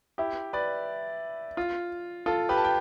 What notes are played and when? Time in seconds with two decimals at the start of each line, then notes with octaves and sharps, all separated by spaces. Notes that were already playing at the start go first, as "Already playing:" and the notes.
0.18 E4 G4
0.53 B4 D5
1.57 F4
2.26 F4 A4
2.49 G4 B4
2.57 A5
2.65 G5